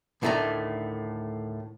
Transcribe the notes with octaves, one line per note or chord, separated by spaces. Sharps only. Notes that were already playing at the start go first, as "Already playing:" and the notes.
D2 A2 D#3 A3 D4 A#5